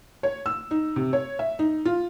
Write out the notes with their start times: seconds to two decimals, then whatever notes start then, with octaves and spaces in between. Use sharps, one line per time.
0.23 C#5
0.46 E6
0.71 D#4
0.96 C3
1.13 C#5
1.39 E5
1.59 D#4
1.85 F4